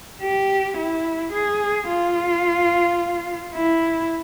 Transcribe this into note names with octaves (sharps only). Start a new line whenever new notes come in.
G4
E4
G#4
F4
E4